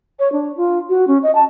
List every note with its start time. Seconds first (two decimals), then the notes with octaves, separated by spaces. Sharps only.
0.19 C#5
0.32 D4
0.57 F4
0.89 F#4
1.07 C#4
1.23 D#5
1.35 A5